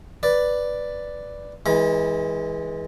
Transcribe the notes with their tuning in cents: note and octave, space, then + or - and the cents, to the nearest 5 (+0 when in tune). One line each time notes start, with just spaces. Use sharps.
B4 +0 D5 +0
E3 -20 G#3 +0 B5 -45